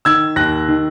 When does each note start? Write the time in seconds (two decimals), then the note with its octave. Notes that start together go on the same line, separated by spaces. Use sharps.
0.05 D#3 E6 G#6
0.36 D#2 F#6 A#6
0.68 D#3